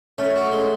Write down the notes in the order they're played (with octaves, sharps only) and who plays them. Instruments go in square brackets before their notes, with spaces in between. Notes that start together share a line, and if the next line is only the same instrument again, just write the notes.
[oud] A3 [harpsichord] C#4
[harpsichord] F#4
G#3